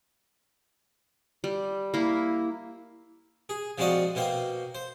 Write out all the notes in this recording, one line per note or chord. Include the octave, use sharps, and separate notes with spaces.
G3
A#3 E4
G#4
F3 G#3 C4 F#4 D5 D#5
B2 A#3 C5 G5
C5